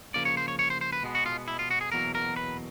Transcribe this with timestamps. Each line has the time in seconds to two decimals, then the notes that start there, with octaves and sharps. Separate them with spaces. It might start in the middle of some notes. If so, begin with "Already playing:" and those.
0.14 C#3 F3 A#3 D5
0.25 C#5
0.37 C5
0.48 C#5
0.59 C#5
0.70 C5
0.81 C5
0.93 B4
1.03 B2 G#3 B3
1.15 F#4
1.26 F4
1.48 E4
1.59 F4
1.71 F#4
1.81 G#4
1.92 E2 B2 F#3 A#3 A#4
2.15 A#4
2.36 B4